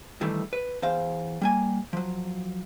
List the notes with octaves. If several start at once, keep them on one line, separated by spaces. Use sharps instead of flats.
G2 D#3 E3 G3 A3
B4
E2 C5 F5
G3 A#3 G#5
F3 F#3